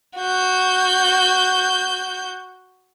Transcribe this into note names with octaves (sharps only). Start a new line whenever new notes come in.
F#4 G6